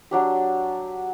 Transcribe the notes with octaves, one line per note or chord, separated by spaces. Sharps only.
F#3 D4 G4